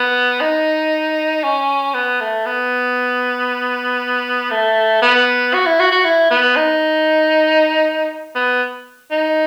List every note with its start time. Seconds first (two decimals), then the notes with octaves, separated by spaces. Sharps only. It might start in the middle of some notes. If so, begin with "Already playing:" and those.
Already playing: B3
0.41 D#4
1.44 C#4
1.94 B3
2.21 A3
2.46 B3
4.51 A3
5.02 B3
5.54 F#4
5.66 E4
5.79 F#4
5.92 F#4
6.04 E4
6.31 B3
6.56 D#4
8.35 B3
9.11 D#4